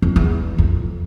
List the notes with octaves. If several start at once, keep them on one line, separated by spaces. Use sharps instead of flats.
F2
E2
F2